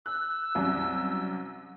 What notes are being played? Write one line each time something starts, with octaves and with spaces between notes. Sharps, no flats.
E6 F#6
C2 F#2